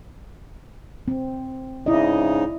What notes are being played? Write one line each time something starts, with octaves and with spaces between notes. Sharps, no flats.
C4
G#2 C#3 D#4 E4 D5 D#5